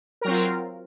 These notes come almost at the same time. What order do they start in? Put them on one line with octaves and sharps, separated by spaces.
A#4 F#3 C4 F4